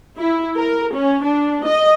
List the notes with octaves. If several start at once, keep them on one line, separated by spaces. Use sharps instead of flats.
E4
A#4
C#4
D4
D#5